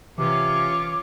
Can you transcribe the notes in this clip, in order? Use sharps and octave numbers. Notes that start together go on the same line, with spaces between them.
C3 E3 C#4 F4 C#5 D6